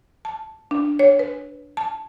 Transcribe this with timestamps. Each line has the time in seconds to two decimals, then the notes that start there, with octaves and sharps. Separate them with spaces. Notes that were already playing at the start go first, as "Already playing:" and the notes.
0.25 A5
0.71 D4
0.99 C#5
1.19 B4
1.77 A5